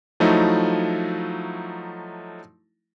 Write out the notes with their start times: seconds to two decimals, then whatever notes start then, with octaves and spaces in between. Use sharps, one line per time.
0.20 F3 F#3 A3 D#4 E4